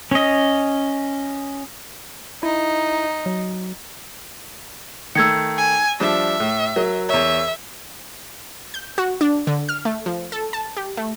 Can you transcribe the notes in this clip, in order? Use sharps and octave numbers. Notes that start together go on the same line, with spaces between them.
C#4 D#5
D#4 E4
F#3
D#3 A3 E6 G#6 C#7
G#5
F3 G3 D4 E5
A2
F#3 A#4
E2 C#5 E5
G6
F#4
D4
D3
F6
A3
F3
A4
A5
G4
A3